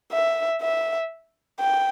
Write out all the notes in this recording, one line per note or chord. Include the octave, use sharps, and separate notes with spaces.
E5
E5
G5